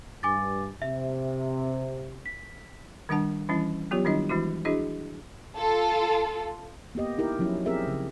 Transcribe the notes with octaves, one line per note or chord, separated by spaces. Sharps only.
G2 G#5 D6 A6
C3 E5
B6
D#3 G3 D4 F#5 A5
E3 G3 C#4 E4
F#3 B3 F4 G4 C#5
D#3 G3 D4 E4 D#5
E3 G#3 E4 F#4
D4 E4 F#4 G#4 D#5
F4 A4
A#3 B3 G4 D#5
D#4 E4 G4 A#4
F3 F#3 C#4 E4
C4 G4 G#4 A#4 E5
C#3